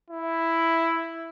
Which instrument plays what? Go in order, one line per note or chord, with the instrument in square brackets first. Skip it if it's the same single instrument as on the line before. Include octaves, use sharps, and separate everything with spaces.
[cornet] E4